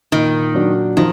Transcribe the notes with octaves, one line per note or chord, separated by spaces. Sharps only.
A#2 D#3
F#3 D4 F#4
D#3 F3